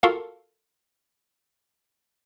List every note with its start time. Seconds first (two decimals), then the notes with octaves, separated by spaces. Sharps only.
0.03 F4 F#4 A4 A#4 F5 A5